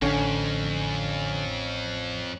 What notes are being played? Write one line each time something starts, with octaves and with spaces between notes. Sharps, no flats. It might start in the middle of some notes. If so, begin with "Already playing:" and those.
A1 F2 D3 C#4 G#5